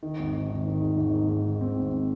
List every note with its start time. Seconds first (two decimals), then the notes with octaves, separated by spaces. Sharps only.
0.03 D#3
0.19 G#1
0.34 D#3
0.50 G#1
0.66 D#3
0.81 G#2
0.97 G#1
1.14 G#2
1.28 G#2
1.45 D#3
1.61 C4
1.77 G#1